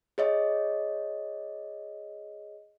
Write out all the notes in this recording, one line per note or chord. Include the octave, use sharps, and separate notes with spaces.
G#4 C#5 D#5